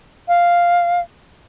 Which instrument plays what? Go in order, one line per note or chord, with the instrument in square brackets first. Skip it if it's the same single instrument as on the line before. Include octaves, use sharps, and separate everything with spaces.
[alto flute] F5